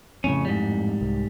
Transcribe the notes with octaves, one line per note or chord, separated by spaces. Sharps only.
F2 A2 C#3 C#4
G#2 G3
C2